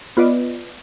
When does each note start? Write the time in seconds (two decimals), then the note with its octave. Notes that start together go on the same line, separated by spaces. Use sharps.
0.17 B3 F4 B4 D5 D#5